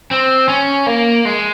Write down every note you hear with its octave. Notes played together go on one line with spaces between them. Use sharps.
C4
C#4
A#3
G#3